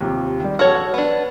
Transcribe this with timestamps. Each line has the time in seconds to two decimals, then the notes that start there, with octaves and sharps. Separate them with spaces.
0.01 D#2 C3 F3
0.40 D#3 G3
0.59 A#1 F#4 A4 C#5 F6
0.75 F#5
0.94 B3 D4